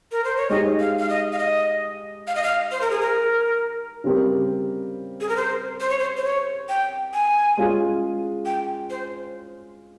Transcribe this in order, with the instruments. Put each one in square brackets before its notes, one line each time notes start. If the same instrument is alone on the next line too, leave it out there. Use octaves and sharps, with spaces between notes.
[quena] A#4
C5
C#5
[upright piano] G#3 D#4 G4 [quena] D#5
[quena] F5
F5
D#5
F5
D#5
F5
D#5
F5
C5
A#4
G#4
A#4
[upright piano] C#3 G3 C4 G4 A#4
[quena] G#4
A#4
C5
C5
C#5
C5
C5
C#5
G5
G#5
[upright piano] G#3 C#4 F4 G#4
[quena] G5
C5